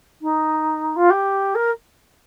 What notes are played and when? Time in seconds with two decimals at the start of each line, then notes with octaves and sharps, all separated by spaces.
0.21 D#4
0.96 F4
1.10 G4
1.55 A#4